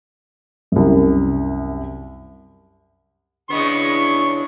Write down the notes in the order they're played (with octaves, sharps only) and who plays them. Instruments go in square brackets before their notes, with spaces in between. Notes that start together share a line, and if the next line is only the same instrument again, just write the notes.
[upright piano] C2 F#2
[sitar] C#3 G#3 B3 [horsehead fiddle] D4 E4 [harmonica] C#6